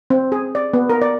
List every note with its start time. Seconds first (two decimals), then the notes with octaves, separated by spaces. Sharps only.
0.10 C4
0.32 G#4
0.55 D5
0.74 B3
0.90 A#4
1.02 D5